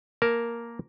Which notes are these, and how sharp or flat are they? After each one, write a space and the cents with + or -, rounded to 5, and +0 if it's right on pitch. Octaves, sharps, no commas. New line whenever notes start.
A#3 +0 A#4 +5 A5 +0